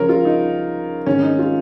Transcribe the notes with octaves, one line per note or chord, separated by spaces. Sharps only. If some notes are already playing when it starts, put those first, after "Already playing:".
Already playing: C#2 C#3 F3 A#4 C#5
F4
D#4
G#1 G#2 D#3 C#4
D#4
F4